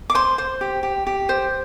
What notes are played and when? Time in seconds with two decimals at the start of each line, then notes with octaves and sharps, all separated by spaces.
0.10 D6
0.15 C5 C6
0.38 C5
0.61 G4
0.83 G4
1.07 G4
1.29 C5